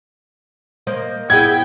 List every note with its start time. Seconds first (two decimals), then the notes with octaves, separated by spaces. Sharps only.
0.87 A#3 C5 D#5
1.30 B3 E4 G#4 G5 G#6